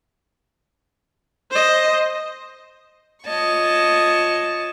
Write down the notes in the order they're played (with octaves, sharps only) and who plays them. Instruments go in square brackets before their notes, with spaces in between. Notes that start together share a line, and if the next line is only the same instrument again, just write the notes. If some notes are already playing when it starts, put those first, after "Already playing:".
[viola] C5 D#5
[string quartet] F4 C#5 D#5 A5 C#6